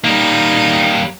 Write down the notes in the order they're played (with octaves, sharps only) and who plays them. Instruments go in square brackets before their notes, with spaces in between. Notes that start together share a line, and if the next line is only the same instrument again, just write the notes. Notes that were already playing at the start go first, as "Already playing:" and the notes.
[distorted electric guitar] G3 A#3 [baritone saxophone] D#4